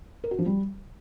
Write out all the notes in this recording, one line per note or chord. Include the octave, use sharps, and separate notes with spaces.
A#4
F#4
F3
G3